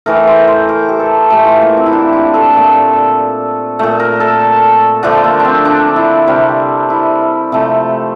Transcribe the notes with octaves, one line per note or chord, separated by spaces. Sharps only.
A2 E3 A3 A#4
C5
C5
A#4
G4
A4
A2 E3 A3 G4
F4
A#3
C4
E4
D4
F4
A4
A#2 A3
A#2 A3
A#4
A4
D3 F3 A3 D4
A#3
D4
C4
D4
E4
C3 G3
E4
C3 F3 A3